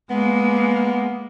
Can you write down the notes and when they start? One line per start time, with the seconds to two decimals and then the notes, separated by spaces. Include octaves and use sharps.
0.10 G#3 A#3 B3